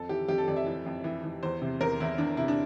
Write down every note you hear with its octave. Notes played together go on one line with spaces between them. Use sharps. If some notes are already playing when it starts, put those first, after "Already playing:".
Already playing: F2 A4
E3 G4
F2 G4
A4
F2 D5
E5
E3
F2
E3
E3
E2 C5
C3
E2 A#4
E2 E4
E2 D4
C3 E4
D4